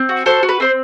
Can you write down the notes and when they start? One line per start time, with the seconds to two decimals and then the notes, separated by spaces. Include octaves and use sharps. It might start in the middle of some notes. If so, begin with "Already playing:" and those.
Already playing: C4
0.09 F#4
0.26 F#4 A4 C5
0.43 F#4
0.49 B4
0.60 C4 C5